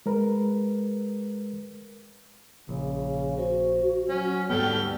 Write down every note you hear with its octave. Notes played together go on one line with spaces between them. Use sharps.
G#3 A#4 B4
A#1 C#3
F#4 C5
F#3 C#4
D2 G#2 G3 B3 A4 G5 F6